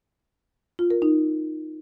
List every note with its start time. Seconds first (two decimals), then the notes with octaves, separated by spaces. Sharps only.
0.79 F4
0.90 A#4
1.02 D#4